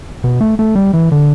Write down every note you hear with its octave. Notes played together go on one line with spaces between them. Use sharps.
B2
A3
A3
G3
E3
D3